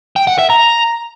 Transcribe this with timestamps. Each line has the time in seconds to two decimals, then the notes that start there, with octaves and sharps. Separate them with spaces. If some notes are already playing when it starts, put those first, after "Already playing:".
0.16 G5
0.27 F#5
0.39 E5
0.50 A#5